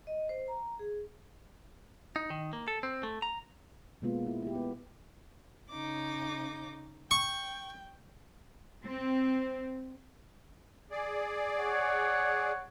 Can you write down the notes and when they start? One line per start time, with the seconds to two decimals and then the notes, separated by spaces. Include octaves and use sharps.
0.07 D#5
0.29 C5
0.48 A#5
0.79 G#4
2.16 D#4
2.30 D#3
2.53 A#3
2.68 A4
2.83 C4
3.03 A3
3.22 A#5
4.02 B2 G#3 A#3 B3 F4
4.27 E4
4.42 E4 G4
4.55 B3
5.70 C#3 D#4 D6
7.11 G5 C#6
8.86 C4
10.91 G#4 D5
11.58 C#5 F#5